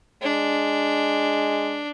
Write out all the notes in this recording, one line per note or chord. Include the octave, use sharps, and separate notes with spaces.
G#3 D4